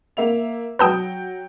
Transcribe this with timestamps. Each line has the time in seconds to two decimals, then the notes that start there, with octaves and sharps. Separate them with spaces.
0.17 A#3 E5 F7
0.79 F#3 B4 G5 A5 D#6 G6